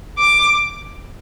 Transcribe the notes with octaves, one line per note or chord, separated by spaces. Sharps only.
D6